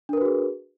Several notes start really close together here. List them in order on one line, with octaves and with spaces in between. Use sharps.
D4 A#4 B4 F#4 G#4